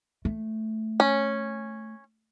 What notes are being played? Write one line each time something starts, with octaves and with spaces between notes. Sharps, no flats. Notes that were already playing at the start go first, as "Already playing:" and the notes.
A3
C#4